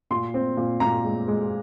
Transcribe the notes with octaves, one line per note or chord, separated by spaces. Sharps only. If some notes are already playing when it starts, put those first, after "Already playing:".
A#2 C6
C4
A#2
A#2 A#5
G#3
G#3